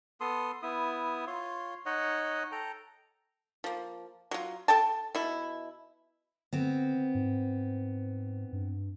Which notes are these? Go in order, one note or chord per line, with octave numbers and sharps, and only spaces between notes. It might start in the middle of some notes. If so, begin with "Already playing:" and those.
B3 A4 C6 D#6
B3 E4 D#6
F4 C#5 C6
D#4 C#5 D#5 F#5
A4 G5 A#5
F3 A#3
F#3 F4
A4 G5 A5
B2 E4
D3 B3 C4
G#2
G2